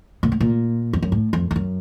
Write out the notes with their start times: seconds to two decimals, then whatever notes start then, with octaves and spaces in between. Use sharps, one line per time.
0.23 A#2
0.32 A2
0.41 A#2
0.93 F2
1.03 F#2
1.12 A2
1.33 F2
1.51 F2
1.56 F#2